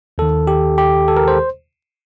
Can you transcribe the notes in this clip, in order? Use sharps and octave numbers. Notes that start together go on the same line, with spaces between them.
D#2 D#3 A4
G4
G4
A4
A#4
C5